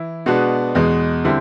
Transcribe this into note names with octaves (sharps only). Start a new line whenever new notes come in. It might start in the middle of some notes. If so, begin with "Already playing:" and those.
Already playing: E3 E4
B2 G#3 B3 D4 F#4
E2 B2 G#3
D3 G3 C4 E4